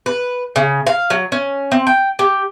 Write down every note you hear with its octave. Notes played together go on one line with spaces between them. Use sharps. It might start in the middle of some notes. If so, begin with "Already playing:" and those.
B4
C#3
F5
F#3
C#4
C4
G5
G4